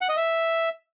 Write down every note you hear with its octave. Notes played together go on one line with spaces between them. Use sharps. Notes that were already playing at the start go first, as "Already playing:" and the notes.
F#5
D#5
E5